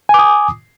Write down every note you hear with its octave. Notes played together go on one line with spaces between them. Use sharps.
G#5 D6 D#6